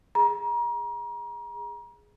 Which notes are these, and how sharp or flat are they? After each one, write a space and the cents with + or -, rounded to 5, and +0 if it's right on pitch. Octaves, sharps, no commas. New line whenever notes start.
G#4 +0 A#5 +35